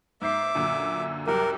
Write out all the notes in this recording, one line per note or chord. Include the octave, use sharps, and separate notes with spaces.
G#2 E5 D6 G6 C7
F#2 A#2 D3
C2 F#2 G4 A#4 F#6